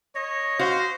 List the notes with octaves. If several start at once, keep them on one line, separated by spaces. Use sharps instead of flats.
C#5 D#5
F#4 C5 F5